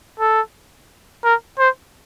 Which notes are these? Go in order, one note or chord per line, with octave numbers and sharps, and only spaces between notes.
A4
A#4
C5